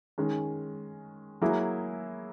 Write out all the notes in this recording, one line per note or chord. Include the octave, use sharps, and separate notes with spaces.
D#3 G#3 C#4
F#3 A#3 E4 G#4